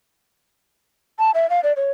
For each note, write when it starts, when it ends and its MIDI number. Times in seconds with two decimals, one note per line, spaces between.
1.19 1.31 81
1.35 1.48 76
1.50 1.60 77
1.64 1.73 74
1.77 1.92 73